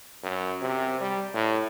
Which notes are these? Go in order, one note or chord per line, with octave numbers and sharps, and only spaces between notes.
F#2
C3
G3
A2